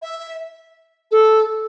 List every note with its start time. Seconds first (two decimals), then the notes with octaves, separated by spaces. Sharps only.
0.02 E5
1.11 A4